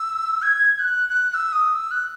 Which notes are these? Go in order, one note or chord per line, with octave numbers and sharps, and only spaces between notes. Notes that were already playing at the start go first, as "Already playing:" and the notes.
Already playing: E6
G#6
G#6
F#6
F#6
F#6
E6
D#6
E6
F#6